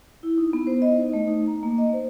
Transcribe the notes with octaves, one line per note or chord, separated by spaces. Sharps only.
E4
D#4
B3
C5
D#5
D#4
A3
D#4
A#5
A#3
D#5
C5